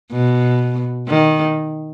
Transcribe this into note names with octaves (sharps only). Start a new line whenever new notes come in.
B2
D#3